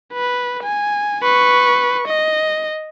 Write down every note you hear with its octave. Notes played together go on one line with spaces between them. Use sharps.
B4
G#5
B4 C#6
D#5